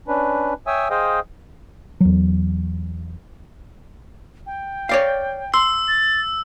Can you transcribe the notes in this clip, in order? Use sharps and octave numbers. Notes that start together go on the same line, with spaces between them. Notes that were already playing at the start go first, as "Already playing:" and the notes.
C#4 D4 B4
C#5 E5 G5 G#5 D#6 E6
G#4 C5 D#5 F5 G5 D#6
E2 F#3
G5
C#5 D5 F5
C6 E6
A6